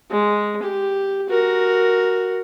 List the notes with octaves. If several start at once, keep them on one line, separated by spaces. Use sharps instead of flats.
G#3
G4
F#4 A#4